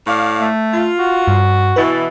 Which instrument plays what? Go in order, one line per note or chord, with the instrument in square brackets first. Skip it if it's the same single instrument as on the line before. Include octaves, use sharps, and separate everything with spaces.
[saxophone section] A2 D5 F5
[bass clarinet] A3
[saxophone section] F4
[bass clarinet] F#4
[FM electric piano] G2
[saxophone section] B2 E3 [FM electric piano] B4 B5 A6